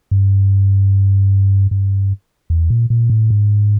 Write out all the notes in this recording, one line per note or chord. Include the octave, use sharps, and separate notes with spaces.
G2
G2
E2
A#2
A#2
A2
G#2